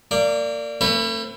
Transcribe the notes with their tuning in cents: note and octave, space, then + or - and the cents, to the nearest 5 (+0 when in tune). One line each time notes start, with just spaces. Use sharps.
A#3 -30 D5 +0
A3 +40 C4 +40 B4 +0